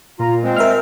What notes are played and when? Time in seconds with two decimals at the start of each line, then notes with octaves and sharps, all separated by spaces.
0.19 A#2 F4 A#5
0.43 G#3 C4
0.57 A#4 E5 F6